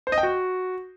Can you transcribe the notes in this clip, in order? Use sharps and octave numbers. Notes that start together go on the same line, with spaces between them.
C5
D#5
G5
F#4